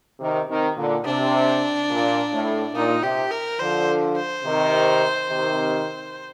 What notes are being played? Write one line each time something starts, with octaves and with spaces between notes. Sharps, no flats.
C3 D#3
C3 D#3
A#2 D3
C3 D4
A#2
A2
A#2 D#4
C3 G4
A#4
D3 F3 C5
C5
C3 D#3
C3 D#3